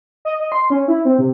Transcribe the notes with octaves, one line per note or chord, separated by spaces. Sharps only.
D#5
D#5
C6
C#4
E4
C4
C3